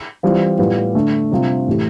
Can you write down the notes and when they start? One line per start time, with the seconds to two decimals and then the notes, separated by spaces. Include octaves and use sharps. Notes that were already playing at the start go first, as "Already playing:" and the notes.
0.23 E3 G3 C4 F4
0.58 A2 G3 B3 F4
0.95 D3 A3 D4
1.32 C3 G3 D4 F4
1.67 A2 E3 A3 E4 G4